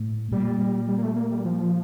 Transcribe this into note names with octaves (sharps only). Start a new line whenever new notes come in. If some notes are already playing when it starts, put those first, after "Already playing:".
Already playing: A2
A#2 G3
G3
G3
A#3
A3
A#3
G3
F3